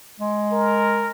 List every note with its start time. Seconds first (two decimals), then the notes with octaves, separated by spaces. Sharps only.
0.20 G#3
0.52 A#4